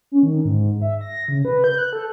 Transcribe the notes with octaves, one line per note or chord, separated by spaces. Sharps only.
C#4
D#3
G#2
E5
A#6
C#3
B4
G6
F#6
A4